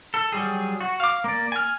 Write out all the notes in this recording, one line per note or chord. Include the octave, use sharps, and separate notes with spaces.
A4
F#3 G3 G#4
F#4
F5 D6
A#3 D5
G#5 F6